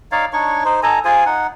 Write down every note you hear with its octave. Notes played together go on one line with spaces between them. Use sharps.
D#4 C#5 D5 F5
D4 D#4 C#5 C#6
D#4 C5
D#4 A4 G#5 A#5
F4 G#4 C5 G#5
D#4 F#5